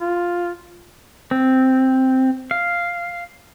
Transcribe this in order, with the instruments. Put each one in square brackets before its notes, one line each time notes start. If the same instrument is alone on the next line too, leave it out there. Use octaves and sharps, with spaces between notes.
[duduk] F4
[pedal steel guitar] C4
F5